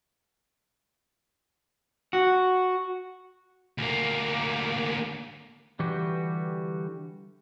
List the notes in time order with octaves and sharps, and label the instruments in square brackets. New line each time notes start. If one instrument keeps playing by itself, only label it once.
[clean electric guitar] F#4
[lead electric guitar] D2 A#3
[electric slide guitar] D3 E3 G3 F#4 G4 B4